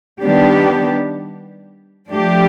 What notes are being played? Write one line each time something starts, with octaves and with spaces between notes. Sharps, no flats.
D#3 G3 B3 D4 G4
F3 A3 D4 G4